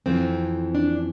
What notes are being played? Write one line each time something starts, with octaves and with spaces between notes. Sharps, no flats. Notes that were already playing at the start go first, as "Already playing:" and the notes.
F2 E3 C4
D4